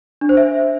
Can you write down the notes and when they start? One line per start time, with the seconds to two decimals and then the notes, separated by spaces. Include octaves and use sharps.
0.21 D4
0.29 C5
0.37 E5